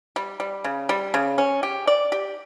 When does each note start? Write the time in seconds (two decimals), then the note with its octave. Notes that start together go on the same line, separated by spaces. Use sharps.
0.16 G3
0.40 G3
0.64 C#3
0.89 G3
1.14 C#3
1.38 C#4
1.63 G4
1.87 D5
2.12 G4